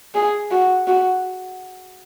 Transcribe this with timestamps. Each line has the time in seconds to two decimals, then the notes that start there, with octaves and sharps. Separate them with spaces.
0.15 G#4
0.51 F#4
0.87 F#4